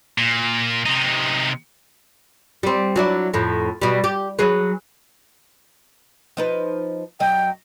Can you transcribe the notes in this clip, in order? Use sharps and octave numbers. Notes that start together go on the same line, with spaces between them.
A#2
C3 D#4
G3 C4
F#3 D4 E4
F2 A2
B2 G3
G4
F#3 G#4 B4
F3 D#4 B4
F#2 F#3 D#5 G5